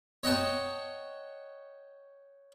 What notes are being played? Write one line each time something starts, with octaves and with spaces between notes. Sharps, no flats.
C#5 D#5 F#5 G5 A5 C#6